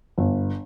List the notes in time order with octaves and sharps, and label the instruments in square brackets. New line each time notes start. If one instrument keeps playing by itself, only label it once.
[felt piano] G1